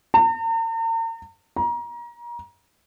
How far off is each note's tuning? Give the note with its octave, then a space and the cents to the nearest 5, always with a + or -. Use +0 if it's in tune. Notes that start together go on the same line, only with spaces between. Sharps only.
A#5 -45
A#5 +30